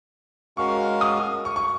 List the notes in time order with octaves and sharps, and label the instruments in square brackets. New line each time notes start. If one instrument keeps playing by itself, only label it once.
[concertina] G#3 C#4 F#4 A#4 F5 [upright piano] C#6
[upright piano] D#6
C#6
C#6